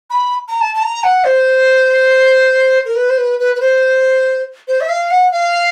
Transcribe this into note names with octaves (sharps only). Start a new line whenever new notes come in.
B5
A#5
A5
A5
A#5
F#5
C5
A#4
B4
C5
B4
B4
B4
C5
C5
E5
F5
F#5
F5